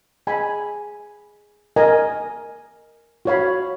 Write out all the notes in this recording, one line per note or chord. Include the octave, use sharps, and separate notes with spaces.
G#4 D#5 G#5 B5
A#4 D#5 G#5
F#4 C#5 F5 B5